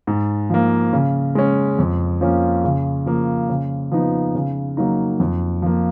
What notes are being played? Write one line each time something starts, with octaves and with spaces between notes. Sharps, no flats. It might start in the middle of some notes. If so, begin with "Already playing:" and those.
G#2
F3 A#3
C#3
G#3 C#4
F2
F3 A#3 C#4
C#3
F3 A#3
C#3
F3 B3 D#4
C#3
F#3 A#3 D#4
F2
F3 A#3